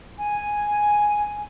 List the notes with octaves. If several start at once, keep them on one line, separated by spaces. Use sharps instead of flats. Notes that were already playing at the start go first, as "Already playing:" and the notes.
G#5